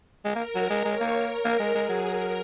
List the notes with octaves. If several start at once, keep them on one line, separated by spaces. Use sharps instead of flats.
G#3 A#4
A#3
F#3
G#3
G#3 C#5
A#3
A#4
A#3
G#3
G#3 G#4
F#3
A#4